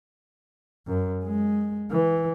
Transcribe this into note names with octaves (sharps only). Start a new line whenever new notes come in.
F#2
G#3
E3